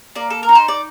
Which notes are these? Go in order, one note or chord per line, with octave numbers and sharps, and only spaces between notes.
A#3 D5
A4
A#4
D#4
C5
D5